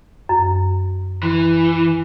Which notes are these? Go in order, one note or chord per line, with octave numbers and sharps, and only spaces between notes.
F#2
E3